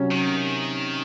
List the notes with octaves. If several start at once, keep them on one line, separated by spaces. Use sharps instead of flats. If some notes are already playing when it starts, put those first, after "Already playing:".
Already playing: C3 F#3 C#4
D#3